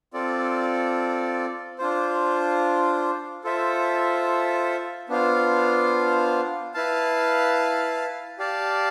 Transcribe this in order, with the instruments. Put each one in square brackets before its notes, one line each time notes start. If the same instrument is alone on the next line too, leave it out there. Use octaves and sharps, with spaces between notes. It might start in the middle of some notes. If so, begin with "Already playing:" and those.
[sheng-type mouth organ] C4 F4 A4 D5
D4 F4 C5
F4 A4 C5 E5
B3 D4 F4 C5 F5
E4 B4 F5 A5
G4 D5 F5 A5